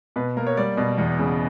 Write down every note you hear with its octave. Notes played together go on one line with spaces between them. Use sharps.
B2 B4
A#3 A#4
C#5
G3 D5
B2
E2
C#3